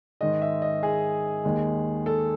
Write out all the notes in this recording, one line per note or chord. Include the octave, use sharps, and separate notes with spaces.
G#2 D#3 G#3 D#5
E5
D#5
G#4
D#2 D#3 G#3
A4